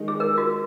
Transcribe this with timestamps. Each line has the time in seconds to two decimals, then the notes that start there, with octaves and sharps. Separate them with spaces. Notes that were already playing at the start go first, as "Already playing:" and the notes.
Already playing: D#3 G#3 D#4
0.08 G#4
0.20 A#4
0.38 F#4